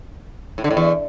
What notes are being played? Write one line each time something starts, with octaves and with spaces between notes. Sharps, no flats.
A2
D3
A2
E2